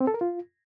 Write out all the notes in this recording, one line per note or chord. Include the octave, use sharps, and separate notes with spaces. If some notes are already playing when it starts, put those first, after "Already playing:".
C4
A4
A#4
F4